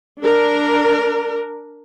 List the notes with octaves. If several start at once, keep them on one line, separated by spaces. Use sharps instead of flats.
D4 A#4